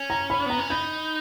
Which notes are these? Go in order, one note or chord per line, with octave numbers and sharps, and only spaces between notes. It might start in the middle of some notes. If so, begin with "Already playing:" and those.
Already playing: C#4
A#5
B5
B3 A#5
C#4
D#4 B5